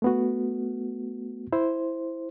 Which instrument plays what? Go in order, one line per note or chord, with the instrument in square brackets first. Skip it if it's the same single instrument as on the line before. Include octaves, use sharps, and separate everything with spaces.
[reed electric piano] A3 B3 F#4
E4 C5